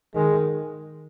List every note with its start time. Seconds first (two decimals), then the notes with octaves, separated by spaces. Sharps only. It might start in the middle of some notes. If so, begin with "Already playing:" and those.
0.15 D#3 G#3